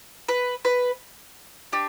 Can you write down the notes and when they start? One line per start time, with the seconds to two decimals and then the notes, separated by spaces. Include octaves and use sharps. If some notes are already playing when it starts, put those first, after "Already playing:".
0.29 B4
0.65 B4
1.73 D4 G4